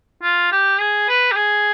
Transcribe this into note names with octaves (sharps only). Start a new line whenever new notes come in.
F4
G4
G#4
B4
G4
G#4